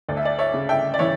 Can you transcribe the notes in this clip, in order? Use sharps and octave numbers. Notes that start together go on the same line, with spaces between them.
D2 D5
E5
D5
C#5 E5
C#3
E5 G5
D5
E3 C#5 E5